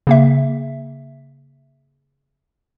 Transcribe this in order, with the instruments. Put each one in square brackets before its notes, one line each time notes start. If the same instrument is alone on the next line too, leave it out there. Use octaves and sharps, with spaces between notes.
[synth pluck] C#3 A#3 E5